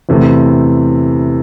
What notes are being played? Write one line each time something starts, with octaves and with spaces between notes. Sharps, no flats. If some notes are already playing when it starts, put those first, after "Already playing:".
E2 C3 E3 A3